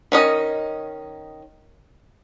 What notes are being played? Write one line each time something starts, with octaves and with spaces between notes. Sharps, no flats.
D#3 C#4 D#5